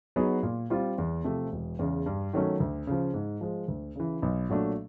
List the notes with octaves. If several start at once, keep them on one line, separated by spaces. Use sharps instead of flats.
F#3 B3 D#4 G#4
A#2
G3 C4 F4
E2
C3 F3 A3
E1
E2 C#3
G2
D#3 F#3 A3 C#4
D2
C#3 F3
G#2
F3 G#3
D2
C#3 E3
B1
A#2 F#3 A3 D4